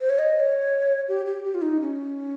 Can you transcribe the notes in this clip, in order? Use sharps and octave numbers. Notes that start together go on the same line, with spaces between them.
C5
C#5
D#5
D#5
C#5
G4
G4
G4
F4
D#4
C#4